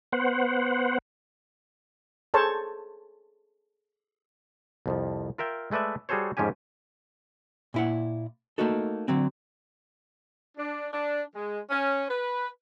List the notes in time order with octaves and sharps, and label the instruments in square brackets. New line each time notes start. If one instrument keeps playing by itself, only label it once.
[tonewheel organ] B3 C5 F#5
[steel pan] G#4 A4 C5 C#5 A5
[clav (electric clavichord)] C2 F2 F3
F4 A#4 E5 G5
G#3 A3 B4 D5 E5
G3 F#4 G#4 A4 C5 C#5
F2 G#2 F3 C#4 G4 G#5
[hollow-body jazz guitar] A#2 E4 F#5
A3 A#3 D#4 F#4 A4
D3 F#3 C4
[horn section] D4
D4
G#3
C#4
B4